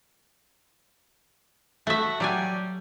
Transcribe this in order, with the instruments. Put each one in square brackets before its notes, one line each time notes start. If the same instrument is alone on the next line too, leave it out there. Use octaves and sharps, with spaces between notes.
[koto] A3 E5 [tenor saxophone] F#4
[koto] F#3 D5 G#5 [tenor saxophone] G3